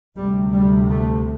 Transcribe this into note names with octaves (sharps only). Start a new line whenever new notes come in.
D2 C3 G3
G3
A3